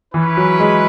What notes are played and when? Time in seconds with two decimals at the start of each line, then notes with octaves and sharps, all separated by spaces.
0.14 E3 C#4 E4 B4
0.37 F#3
0.60 G#3